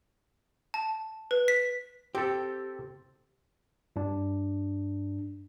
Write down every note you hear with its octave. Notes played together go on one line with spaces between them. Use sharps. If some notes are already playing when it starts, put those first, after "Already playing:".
A5
B4
B6
C4 G4 A4
G2 D4